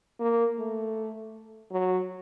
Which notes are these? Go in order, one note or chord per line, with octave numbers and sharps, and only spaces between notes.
A#3
A3
F#3